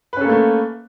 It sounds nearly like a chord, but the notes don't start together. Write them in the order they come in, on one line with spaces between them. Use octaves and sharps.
B4 C#4 A4 A#3 A3